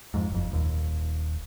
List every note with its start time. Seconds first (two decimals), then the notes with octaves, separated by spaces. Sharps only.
0.14 F2 G#2
0.31 F#1 F2
0.51 D#1 D#2